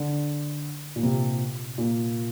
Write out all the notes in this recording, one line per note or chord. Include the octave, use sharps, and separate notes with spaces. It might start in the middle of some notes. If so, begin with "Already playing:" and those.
Already playing: D3
A#2
C3
A#2